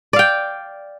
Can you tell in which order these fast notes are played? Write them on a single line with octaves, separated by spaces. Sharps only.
D5 F5 G5